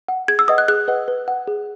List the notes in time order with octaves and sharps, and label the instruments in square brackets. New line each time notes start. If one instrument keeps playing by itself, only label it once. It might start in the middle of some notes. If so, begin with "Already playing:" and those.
[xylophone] F#5
G#4 G#6
E6
B4 D#5 F#5 D#6
F#6
G#4 F#6
B4 D#5 F#5
B4
F#5
G#4